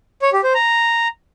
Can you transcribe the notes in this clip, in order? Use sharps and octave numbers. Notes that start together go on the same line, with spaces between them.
C#5
G4
C5
A#5